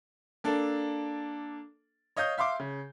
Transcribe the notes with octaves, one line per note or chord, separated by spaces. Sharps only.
A#3 D4 A4
C#5 D#5 F5 D#6 G6
E5 F5 C6 D6
C#3